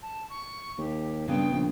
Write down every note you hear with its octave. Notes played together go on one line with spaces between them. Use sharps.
A5
C#6
D#2 G4
G2 C#3 B3 C4 G5
A#1